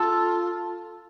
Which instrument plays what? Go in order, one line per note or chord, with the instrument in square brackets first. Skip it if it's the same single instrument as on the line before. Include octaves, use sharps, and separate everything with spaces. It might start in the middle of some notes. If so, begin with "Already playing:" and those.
Already playing: [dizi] F4 [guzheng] A4